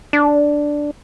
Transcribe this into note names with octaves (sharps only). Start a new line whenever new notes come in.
D4